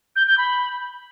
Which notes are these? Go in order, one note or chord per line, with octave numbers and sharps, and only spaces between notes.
G6
G6
B5